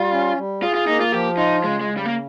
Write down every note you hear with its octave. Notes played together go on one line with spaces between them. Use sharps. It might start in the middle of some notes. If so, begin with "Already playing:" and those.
Already playing: G3 F4
C#4
G3
F4 G#4
F4
A#3 D#4
F4
F3 G4
D#4 F4
C#3 G#3
G#3
C#3
G3
A#3